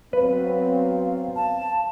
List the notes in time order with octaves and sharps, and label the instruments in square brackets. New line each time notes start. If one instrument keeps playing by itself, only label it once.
[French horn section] F#3 B3 C4 [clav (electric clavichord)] B4 [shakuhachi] F5
[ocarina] A5